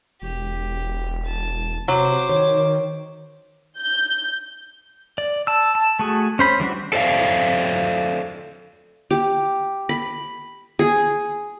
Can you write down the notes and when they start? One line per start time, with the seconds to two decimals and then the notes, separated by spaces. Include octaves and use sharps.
0.22 E1 G4
1.26 A5
1.88 C3 F#3 C5 D6
2.30 D#3 C#5
3.79 G6
5.18 D5
5.47 A5 E6
5.75 A5
5.99 A3 F#4 G#4
6.39 C#4 C5 B5
6.60 E3 G3 D4 F#4
6.93 A4 C5 D5 E5 F5
9.11 G4
9.89 B5
10.79 G#4